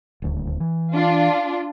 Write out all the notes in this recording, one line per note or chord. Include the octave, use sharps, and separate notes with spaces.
D#1 D2
E3
D4 F4